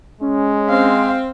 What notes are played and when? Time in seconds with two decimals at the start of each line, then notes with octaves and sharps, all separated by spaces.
0.21 G#3 C#4
0.69 C4 F5